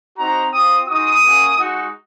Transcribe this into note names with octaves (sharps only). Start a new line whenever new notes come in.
C4 D#4 F#4 A#5
C4 F4 D#6
G#3 D#4 F#4 D#6
A#3 C#4 F#4
G#3 D#4 F#4